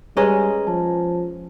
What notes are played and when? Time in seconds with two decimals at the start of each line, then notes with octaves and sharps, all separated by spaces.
0.17 G3 G#3 C#4 G#4 B4 D#5 A#5
0.67 F3 A5